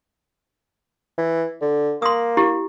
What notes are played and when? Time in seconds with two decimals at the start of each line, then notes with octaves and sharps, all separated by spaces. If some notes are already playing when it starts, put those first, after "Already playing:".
1.18 E3
1.62 D3
2.02 A#3 C6 D#6
2.37 E4 G4